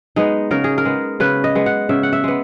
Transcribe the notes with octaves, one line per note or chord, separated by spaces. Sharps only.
G#3 B3 D#4
C#3 A#4
G#4
A#4
G#3 B3
C#3 B4
D#5
G#3 B3
F#5
C#3 E5
F#5
E5
G#3 B3